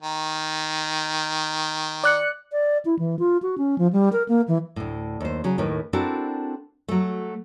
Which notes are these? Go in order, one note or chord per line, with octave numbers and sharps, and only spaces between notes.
D#3
D5 F#6 C#7
D5
E4
E3
F4
F#4
C#4
F3
G3
A#4
A#3
E3
D2 A2
D#2 C5
C#3 F#3
D#2 A2 D#3 A#4 B4
C4 D4 E4 F#4 A4 A#4
F#3 A3